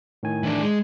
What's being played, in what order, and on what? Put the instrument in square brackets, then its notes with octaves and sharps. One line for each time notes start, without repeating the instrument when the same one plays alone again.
[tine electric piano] A2 D#3 G#5
[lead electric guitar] E3 D4
G#3